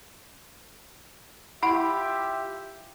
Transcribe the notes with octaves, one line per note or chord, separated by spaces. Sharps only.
E4 F4 G4 E5 F#5 B5